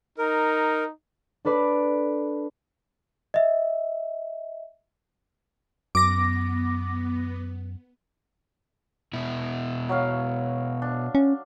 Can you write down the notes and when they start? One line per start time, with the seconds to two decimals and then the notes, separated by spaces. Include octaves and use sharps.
0.18 D#4 A#4
1.45 D4 A4 B4 D5
3.34 D#5 E5
5.95 F#2 B3 D6 A#6
9.13 B2 E4
9.89 F#3 C#5 F5
10.82 D4
11.15 C#4